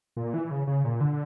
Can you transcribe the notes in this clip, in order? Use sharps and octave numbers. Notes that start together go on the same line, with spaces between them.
A#2
E3
C#3
C#3
A#2
D3